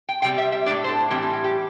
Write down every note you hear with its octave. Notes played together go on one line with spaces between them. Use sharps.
G5
C3 G3 C4 G5
E5
E5
A2 A3 D4 D5
C5
A4
A2 E3 G3 C4 G4
A4
G4
G4